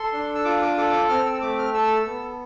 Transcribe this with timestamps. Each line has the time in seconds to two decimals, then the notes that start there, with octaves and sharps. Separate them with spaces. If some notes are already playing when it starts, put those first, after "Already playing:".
Already playing: A4 C6
0.13 D4
0.35 E6
0.45 F4 D6
0.62 D6
0.77 A4 D6
0.93 D6
1.09 C4 F6
1.26 E6
1.41 A3 D6
1.59 F6
1.74 A4 E6
2.06 B3